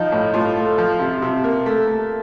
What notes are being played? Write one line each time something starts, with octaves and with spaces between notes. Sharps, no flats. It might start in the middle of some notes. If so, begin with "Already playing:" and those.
Already playing: F3 D#4
A2
A2 F4
A3
F3
C3
C3
A#3
A3
A3